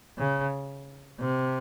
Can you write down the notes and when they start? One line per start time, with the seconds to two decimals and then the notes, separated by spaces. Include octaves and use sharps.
0.18 C#3
1.20 C3